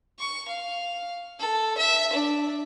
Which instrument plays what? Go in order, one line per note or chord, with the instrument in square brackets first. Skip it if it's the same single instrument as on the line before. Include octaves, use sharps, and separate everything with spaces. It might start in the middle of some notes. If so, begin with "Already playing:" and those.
[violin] C#6
F5
A4
E5
D4